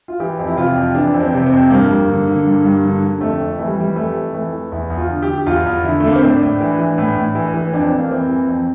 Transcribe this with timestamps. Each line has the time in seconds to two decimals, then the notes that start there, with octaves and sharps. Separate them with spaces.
0.08 F4
0.20 E3 G4
0.39 F2
0.47 E4
0.57 C3 F4
0.76 F2
0.95 E3 D4
1.14 F2
1.21 C4
1.34 C3
1.46 C4
1.52 F2
1.70 G2 A#3
1.89 G2
2.08 D3
2.28 D3
2.46 G2
2.64 G2
2.84 D3
3.03 D3
3.21 F2 A3
3.39 F2
3.59 E3 A3
3.66 G3
3.78 E3 G3
3.96 F2 A3
4.15 F2
4.34 E3 A3
4.52 E3
4.72 E2 E4
4.90 E2
4.97 F4
5.09 D3
5.22 G4
5.28 D3
5.38 G4
5.46 E2 F4
5.66 E2
5.84 D3 E4
6.00 A3
6.03 D3 A#3
6.16 C4
6.23 A2 D4
6.41 A2
6.61 E3
6.79 E3
6.98 A2
7.17 A2
7.35 E3
7.54 E3
7.73 F2 D4
7.86 C4
7.92 F2
7.99 A#3
8.11 E3 C4
8.29 E3
8.48 F2